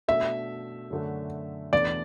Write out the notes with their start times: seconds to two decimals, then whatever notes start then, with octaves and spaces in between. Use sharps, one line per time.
0.08 B2 A3 D4 E5
0.91 F#2 D3 A3 D4 F#4
1.73 E2 B2 A3 D4 D5